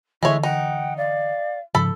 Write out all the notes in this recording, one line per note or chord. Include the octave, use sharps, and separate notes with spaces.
D3 E3 G#3 A3 E4 C#5
D#4 F#5 G5
D5 F5
G#2 C#3 F3 A4 B5